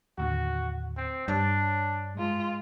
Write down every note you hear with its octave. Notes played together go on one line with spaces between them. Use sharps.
D#2 A2 D3 F#4
C4
G2 D4 C#5
G#2 F4